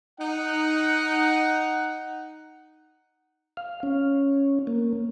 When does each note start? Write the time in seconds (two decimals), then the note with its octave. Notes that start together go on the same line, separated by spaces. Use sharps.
0.19 D#4 F#5
3.57 F5
3.83 C#4
4.67 A#3